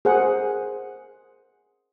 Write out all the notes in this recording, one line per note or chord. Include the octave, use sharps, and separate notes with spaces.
G#4 A#4 C5 F#5